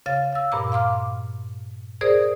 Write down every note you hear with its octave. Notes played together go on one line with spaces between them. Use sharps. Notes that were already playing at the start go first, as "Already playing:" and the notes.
C#3 F5 A6
F5 E6
G2 A#2 A#5 D6
F5 C6 D6 F6
G#4 A#4 C5 D5 D#6